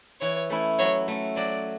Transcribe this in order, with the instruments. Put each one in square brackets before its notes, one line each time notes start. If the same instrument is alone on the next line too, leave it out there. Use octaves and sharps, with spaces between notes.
[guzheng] E3 [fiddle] C#5
[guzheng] A3 C#4 E4
[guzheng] F#3 [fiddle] C#5
[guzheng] A3 C#4
[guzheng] F#3 [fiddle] D5